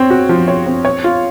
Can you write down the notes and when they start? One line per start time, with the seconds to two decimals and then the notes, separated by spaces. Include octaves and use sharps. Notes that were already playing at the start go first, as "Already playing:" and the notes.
Already playing: C4 C#5
0.10 F#4
0.29 F3
0.48 C#5
0.66 C4
0.85 C#5
1.04 F4